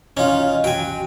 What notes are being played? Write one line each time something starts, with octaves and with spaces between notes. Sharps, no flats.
C#4 D#4 F4
F#3 G5 G#5